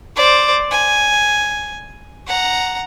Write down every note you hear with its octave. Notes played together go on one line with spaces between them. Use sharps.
C5 D5
G#5
F#5 A#5